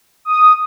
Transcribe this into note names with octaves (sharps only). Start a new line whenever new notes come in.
D#6